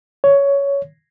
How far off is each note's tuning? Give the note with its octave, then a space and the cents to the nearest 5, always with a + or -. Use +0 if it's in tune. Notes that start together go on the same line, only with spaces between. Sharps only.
C#5 +10